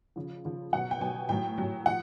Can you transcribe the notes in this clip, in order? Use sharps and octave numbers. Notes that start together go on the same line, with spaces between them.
C#3 F3
C#3 F3
B2 F#3 F#5
G5
B2 F#3 G#5
A2 F#3 G5
A2 F#3
F3 F#5